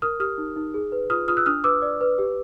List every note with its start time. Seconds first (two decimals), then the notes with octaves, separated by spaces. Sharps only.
0.02 A#4 D#6 F6
0.20 G4 D#6 F6
0.38 D#4
0.56 D#4
0.74 G#4
0.92 B4
1.10 F4 D#6 F6
1.28 F4 D#6 F6
1.37 E6 F#6
1.46 D4 D#6 F6
1.64 B4 D6 E6
1.82 D5
2.01 B4
2.18 G4